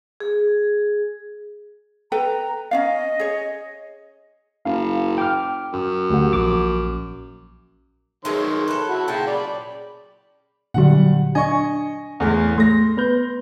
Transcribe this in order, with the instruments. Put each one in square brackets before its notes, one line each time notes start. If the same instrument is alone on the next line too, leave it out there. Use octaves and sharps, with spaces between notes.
[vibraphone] G#4
[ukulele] A4 B4 G5 [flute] A#5
[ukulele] C#4 D4 F5 [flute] D#5
[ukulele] G#4 C#5
[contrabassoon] F#1 [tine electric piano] F5
[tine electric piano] G5 D6 F6
[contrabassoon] F#2
[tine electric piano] D2 G4 F#5
A#1 D6
[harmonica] D#3 C#5 C6 [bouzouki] F#3 G#3
[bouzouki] A4 B4
[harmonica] E4 F#4
[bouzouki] A#2 C#3 [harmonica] G5 A5
[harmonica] D5 B5
[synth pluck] A#2 D3 F#3 [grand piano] G3 F#5
[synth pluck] D4 G#5 [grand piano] D#5 C#6
[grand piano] E2 A2 G#3
[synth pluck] A3 [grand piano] C6 A#6
[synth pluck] B3 B4 G6